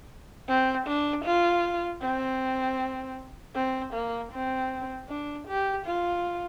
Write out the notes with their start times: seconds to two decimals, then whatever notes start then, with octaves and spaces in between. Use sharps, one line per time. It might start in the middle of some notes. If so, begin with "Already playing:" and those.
0.48 C4
0.87 D4
1.25 F4
2.02 C4
3.55 C4
3.94 A#3
4.32 C4
5.08 D4
5.47 G4
5.86 F4